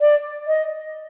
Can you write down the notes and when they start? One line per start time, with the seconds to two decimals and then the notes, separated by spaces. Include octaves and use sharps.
0.01 D5
0.47 D#5